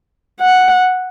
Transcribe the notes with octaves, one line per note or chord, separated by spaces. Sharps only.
F#5